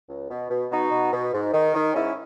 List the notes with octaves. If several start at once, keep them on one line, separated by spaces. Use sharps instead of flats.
C#2
B2
B2
B2 D#4 F#4
B2
B2
G#2
D#3
D#3
G#2 C#4 E4